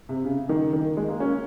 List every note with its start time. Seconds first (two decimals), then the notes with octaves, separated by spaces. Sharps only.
0.09 C3
0.25 C#3
0.49 D#3
0.73 D#3
0.97 G#3
1.08 A#3
1.20 C#4